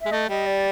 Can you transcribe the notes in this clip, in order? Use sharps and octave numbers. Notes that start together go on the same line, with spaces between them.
G#3 E5
A3 D#5
G3 D#5
D5